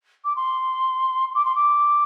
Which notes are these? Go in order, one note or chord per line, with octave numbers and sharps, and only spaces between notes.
D6
C6
D6
C6
D6